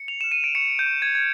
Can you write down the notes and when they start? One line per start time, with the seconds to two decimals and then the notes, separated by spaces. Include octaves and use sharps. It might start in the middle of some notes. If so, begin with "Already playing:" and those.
Already playing: C#7
0.08 F7
0.21 F6 E7
0.32 D#7
0.44 D7
0.55 C#6 C#7
0.79 G6
0.86 C#6
1.02 G#6
1.15 F6 G#6